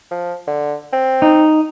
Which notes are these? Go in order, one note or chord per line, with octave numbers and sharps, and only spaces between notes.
F3
D3
C4
D#4